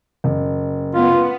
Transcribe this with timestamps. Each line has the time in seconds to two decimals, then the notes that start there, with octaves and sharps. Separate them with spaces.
0.24 F#1
0.94 B3 F4